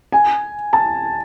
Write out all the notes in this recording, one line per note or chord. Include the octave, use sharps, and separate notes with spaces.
G#5
A5